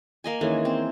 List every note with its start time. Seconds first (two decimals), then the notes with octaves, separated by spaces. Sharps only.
0.24 A#3 D#5 G#5
0.41 D#3 E3 G#3 A#3 C#4
0.65 C4